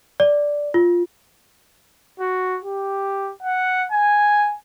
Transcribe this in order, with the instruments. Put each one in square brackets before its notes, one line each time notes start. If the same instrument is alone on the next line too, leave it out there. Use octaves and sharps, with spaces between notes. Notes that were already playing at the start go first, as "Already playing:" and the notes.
[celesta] D5
F4
[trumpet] F#4
G4
F#5
G#5